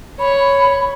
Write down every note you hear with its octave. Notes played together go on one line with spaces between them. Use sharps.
C#5 B5